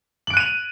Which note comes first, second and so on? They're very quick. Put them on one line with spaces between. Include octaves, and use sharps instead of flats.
F#7 D7 F#6 D#7 F7